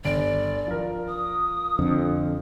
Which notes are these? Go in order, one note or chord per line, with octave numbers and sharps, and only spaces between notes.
G1 D5 D7
F3 A#4
D#6
F2 D3